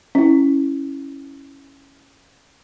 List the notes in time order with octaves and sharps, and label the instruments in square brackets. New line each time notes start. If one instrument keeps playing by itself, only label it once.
[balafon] C#4 E4